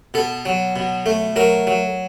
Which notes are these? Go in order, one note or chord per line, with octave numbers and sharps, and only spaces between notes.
B2 A4
F#3
B2
A3
F#3 A#4
F#3